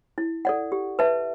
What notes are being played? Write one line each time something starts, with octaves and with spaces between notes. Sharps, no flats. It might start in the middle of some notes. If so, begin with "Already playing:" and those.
E4
A4 D5 F#5
G4
B4 E5 A5